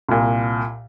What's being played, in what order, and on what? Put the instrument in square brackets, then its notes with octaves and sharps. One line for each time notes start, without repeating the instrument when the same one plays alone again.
[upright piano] C2 A#2